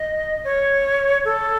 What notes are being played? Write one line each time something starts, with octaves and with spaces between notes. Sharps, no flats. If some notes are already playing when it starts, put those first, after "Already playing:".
Already playing: D#5
C#5
A4